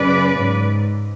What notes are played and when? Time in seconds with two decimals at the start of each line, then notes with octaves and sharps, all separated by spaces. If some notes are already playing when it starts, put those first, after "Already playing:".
Already playing: F#2 C#3 B4 D5
0.39 G#2